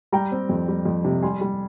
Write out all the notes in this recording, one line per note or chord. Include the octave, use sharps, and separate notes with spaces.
G3 G5 A#5
C4
F2
G3
F2
C3
G3 G#5 C6
G3